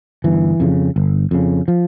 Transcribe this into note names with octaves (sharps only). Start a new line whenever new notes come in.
G1 E3
F2 C#3
G1
F2 C#3
F3